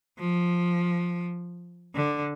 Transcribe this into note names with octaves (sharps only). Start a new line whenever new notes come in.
F3
D3